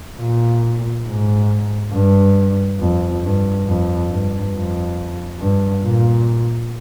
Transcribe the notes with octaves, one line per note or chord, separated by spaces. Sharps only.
A#2
G#2
G2
F2
G2
F2
G2
F2
G2
A#2